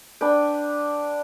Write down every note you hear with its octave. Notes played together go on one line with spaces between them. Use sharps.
D4 B4 G5